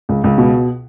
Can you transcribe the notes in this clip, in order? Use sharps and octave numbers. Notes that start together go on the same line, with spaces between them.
C#2
C#2
B2